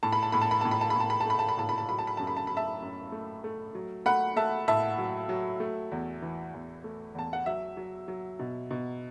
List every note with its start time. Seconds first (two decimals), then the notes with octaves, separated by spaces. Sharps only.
0.03 A2 A5
0.13 B5
0.23 A5
0.32 A2 B5
0.41 A5
0.51 B5
0.61 A2 A5
0.71 B5
0.81 A5
0.90 B5
0.96 A2 A5
1.10 B5
1.21 A5
1.26 A3 B5
1.39 A5
1.49 B5
1.58 A2 A5
1.69 B5
1.78 A5
1.89 F#3 B5
1.99 A5
2.07 B5
2.17 F#2 A5
2.27 B5
2.37 A5
2.47 F#2 B5
2.57 E5 A5
2.82 F#2
3.12 A3
3.44 A3
3.75 F#3
4.06 A3 F#5 B5
4.36 A3 E5 A5
4.68 A2 E5 A5
4.98 F#3
5.29 F#3
5.60 A3
5.92 E2
6.22 E3
6.54 E2
6.84 A3
7.15 E2 A5
7.33 F#5
7.46 F#3 E5
7.77 F#3
8.08 F#3
8.39 B2
8.71 B2